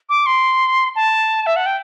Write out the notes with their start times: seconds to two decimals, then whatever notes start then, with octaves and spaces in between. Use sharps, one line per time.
0.09 D6
0.26 C6
0.95 A5
1.46 E5
1.56 F#5
1.66 G5